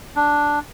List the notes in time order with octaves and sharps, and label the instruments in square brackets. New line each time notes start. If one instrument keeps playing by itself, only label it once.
[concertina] D4